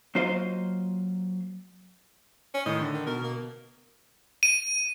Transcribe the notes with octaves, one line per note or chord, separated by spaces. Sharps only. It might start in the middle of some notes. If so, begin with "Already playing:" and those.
F#3 A#3 F4 C5 D#5 F5
C#4
A2 D#3 D#5
D3
D#3
B2 A#4
A#3
D#7